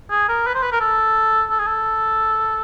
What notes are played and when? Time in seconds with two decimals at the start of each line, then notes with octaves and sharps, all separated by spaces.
0.10 G#4
0.28 A#4
0.46 B4
0.55 C5
0.63 B4
0.72 A#4
0.80 A4
1.50 A4
1.59 G#4
1.66 A4